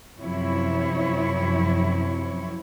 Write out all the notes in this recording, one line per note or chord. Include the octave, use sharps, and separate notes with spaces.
F#2 C3 F3 E4 C#5